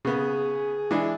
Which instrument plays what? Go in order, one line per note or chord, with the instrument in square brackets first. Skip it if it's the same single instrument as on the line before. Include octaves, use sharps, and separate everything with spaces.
[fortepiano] C#3 B3 [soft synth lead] G#4
[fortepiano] E3 G#3 D4